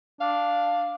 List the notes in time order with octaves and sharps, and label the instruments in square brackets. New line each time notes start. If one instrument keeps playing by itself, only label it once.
[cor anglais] D4 [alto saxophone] F5